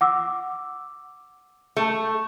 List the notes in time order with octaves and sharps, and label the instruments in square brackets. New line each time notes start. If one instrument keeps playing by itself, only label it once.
[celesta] F#5 D6 E6
[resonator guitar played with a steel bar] A3